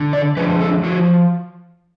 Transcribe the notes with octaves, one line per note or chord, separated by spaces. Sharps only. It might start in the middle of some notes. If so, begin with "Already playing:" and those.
Already playing: D3
D5
F3 G#3 D4 B4
A4
F3 F#4